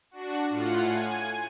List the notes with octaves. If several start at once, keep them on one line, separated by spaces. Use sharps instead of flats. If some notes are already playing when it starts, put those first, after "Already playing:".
D4 F#4
A2 F4 F#5
G#5